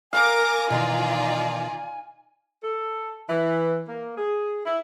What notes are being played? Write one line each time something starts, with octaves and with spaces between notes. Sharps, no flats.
A#4 F5 G#5 D6 A#6
B2 D#3 E3 D#4 F4 D5
A4
E3
A#3
G#4
E4